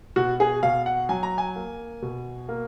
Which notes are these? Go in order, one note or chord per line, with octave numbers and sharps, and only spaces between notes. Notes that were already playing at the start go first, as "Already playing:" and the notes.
B2 F#4
G#4
B2 F5
F#5
F#3 G#5
A#5
G#5
A#3
B2
A#3